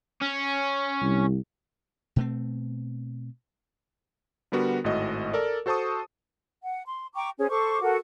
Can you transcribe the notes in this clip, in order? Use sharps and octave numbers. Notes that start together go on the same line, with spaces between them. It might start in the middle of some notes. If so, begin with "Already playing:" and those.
C#4
C2
B2 A3 C4
D3 G3 B3 F#4 A#4
G#1 A2 F#4 D#5
A4 A#4 D5
F#4 A4 C5 A5 C#6 D#6
F#5
C6
G5 A#5 C#6 D6
C#4 G#4 C5 C#5
A4 C5 C#6 D6
F#4 A4 A#4